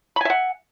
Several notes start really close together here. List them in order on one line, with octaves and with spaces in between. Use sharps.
B5 G#5 E5 F#5